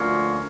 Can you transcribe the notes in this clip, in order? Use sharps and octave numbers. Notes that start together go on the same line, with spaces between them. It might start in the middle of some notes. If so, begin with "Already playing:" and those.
Already playing: D2 D3 F3 A#3 C#4